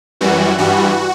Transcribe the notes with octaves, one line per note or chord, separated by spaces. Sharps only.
F#2 E3 G3 F#4
G2 E3 G3 F#4